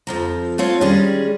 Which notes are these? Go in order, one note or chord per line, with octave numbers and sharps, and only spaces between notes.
F2 F3 A#5
A3 C4 F4 C#5 F5
D#3 G3 G#3 C#4 G#4